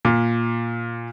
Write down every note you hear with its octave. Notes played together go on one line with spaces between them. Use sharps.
A#2